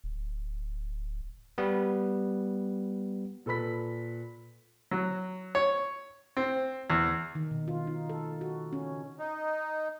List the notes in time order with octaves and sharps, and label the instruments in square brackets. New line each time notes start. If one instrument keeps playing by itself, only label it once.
[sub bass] D1
[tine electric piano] G3 B3
[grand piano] A#2 A4 B4 B5 B6
[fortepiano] F#3
C#5
C4
E2
[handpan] D#3
B2
F4
D#4
A4
F#4
C#4
[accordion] D#4